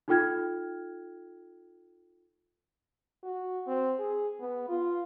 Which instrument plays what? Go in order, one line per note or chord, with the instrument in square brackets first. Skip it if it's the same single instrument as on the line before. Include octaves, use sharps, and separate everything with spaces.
[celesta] D#4 F4 A4 G5 F6 G#6
[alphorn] F#4
C4
G#4
B3
F4